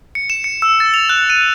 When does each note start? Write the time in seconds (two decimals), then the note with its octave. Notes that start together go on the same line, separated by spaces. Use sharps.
0.15 C#7
0.30 E7
0.44 C#7
0.62 E6
0.80 A6
0.94 F7
1.09 F#6
1.30 D#7